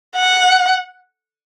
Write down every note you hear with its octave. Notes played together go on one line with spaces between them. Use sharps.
F#5